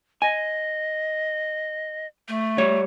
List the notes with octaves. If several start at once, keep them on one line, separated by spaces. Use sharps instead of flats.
D#5 G#5
A3
G3 C#5